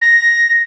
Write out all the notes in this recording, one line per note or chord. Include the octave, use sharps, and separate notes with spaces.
A#6